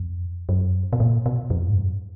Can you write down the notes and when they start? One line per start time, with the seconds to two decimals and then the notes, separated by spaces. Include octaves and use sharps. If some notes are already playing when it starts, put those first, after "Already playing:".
Already playing: F2
0.49 F#2
0.93 B2
1.00 A#2
1.26 B2
1.50 F2
1.69 G#2
1.76 F#2